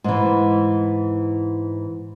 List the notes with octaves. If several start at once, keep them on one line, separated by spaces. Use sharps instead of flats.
G#2 E3